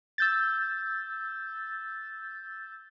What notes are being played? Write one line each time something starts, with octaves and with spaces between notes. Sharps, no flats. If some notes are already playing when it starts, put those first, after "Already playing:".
E6 G6 A6